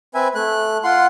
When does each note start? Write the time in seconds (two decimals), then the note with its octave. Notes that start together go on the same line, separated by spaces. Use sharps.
0.15 C4 B4 E5 G#5
0.35 A3 F#6
0.84 F4 F#5 C6